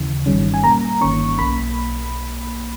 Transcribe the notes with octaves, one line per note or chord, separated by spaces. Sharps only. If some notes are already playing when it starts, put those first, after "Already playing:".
Already playing: D#2 C#3 E3
G1 G2 D#3 G3 C#4
G#5
A#2 G3 A#3 A#5
G1 G2 D#3 A#3 C#4 C#6
B1 B2 A#3 B5